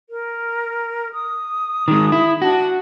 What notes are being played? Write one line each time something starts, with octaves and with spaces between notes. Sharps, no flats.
A#4
D#6
D#3 G#3
E4
D4 F#4